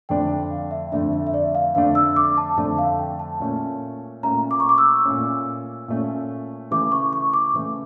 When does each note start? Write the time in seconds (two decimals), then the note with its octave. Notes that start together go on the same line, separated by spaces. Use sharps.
0.09 F2 D3 A3 D4 G5
0.30 G5
0.51 F5
0.71 E5
0.92 F2 D3 A3 D4 E5
1.13 E5
1.27 E5
1.34 D5
1.55 F5
1.75 F2 D3 A3 D4 F5
1.95 E6
2.16 D6
2.38 A5
2.57 F2 D3 A3 D4 A5
2.78 F5
2.99 G5
3.19 A5
3.40 A#2 A3 C#4
4.23 A#2 A3 C#4 A#5
4.51 D6
4.60 C#6
4.69 D6
4.78 E6
5.05 A#2 A3 C#4
5.88 A#2 A3 C#4
6.71 C#3 E3 A3 D6
6.92 C#6
7.13 C#6
7.34 D6
7.54 C#3 E3 A3